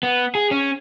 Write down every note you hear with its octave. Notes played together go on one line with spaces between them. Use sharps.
B3
G#4
C#4